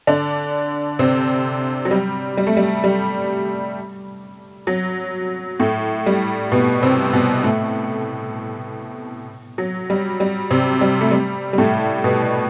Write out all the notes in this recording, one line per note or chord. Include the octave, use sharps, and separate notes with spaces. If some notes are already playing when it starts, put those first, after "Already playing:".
D3 D4
C3 C4
F#3
G3
G3
A3
G3
G3
F#3
A2 A3
G3
B2 B3
C3 C4
B2 B3
A2 A3
F#3
G3
G3
C3 C4
G3
A3
G3
G3
A2 A3
B2 B3